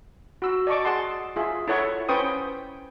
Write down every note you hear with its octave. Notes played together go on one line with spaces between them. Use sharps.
F#4 E6
D5 D#5 A5 C#6 D6
G#4 F#5 A5 C6
F4 G#4 E5
E4 A4 C#5 F#5 C#6
C#4 B4 C5 G5 C#6 D#6